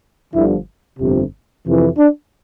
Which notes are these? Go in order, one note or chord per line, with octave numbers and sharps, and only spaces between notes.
G1 G2 D3 F3 E4
G1 F2 C3
F2 C3 E3
D4